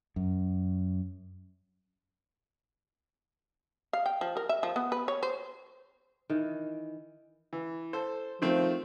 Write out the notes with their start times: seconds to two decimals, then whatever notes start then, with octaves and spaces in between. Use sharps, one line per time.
0.16 F#2
3.93 F5
4.06 G5
4.21 F3
4.37 A#4
4.49 E5
4.63 F3
4.76 B3
4.92 B4
5.08 C#5
5.23 C5
6.30 D#3 E3
7.53 E3
7.93 A4 C5
8.42 D#3 F3 A3 C4